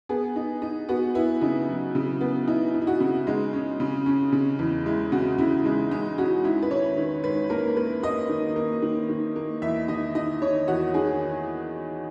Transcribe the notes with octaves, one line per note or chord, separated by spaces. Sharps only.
B3 G#4
D#4
D#4
B3 F#4
B3 E4
C#3 D#4
F#3
C#3
B3
D#4 E4
D#4
E4
F#4
C#3
G#3 D#4
C#4
C#3
C#4
C#3
E2
G#3 E4
C#3 F#4
C#3 E4
G#3 D#4
G#3 D#4
C#4 F#4
G#2 E4
B4
D#3 C#5
D#3
G#2 B4
A#3 A#4
A#3 B4
A#3 D#5
D#3
A#3
D#3
D#3
A#3
E2 E5
D#3 D#5
D#3 D#5
D#3 C#5
E2 F#4
D#3 G#4